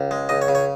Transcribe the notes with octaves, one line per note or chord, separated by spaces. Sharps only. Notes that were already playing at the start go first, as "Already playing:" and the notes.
Already playing: C#2
G#3
C#2 D#5
C#5
C#3
C#5